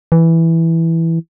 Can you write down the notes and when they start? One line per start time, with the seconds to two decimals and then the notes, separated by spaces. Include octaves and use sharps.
0.12 E3